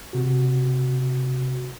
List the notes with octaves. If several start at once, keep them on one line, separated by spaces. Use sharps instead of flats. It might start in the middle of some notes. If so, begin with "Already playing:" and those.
C3 F#4